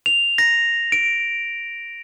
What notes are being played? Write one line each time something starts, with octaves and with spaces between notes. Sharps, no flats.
F7
A#6
D7